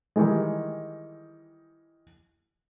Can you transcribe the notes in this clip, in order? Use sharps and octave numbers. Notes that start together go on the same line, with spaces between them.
D#3 E3 G3 G#3